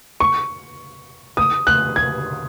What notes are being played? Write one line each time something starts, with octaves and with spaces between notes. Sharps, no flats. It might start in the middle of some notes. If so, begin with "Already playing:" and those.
C#6
D#6
F#6
G#6